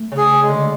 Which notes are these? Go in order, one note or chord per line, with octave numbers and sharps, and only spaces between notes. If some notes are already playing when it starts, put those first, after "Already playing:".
Already playing: A3
C#3
G#4
G#3
D3